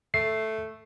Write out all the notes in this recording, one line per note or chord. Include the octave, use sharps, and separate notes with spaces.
A3 C7